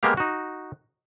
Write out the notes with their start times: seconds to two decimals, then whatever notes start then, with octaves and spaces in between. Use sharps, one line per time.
0.03 G#3 A#3 B3 G4 F5
0.17 D#4 F#4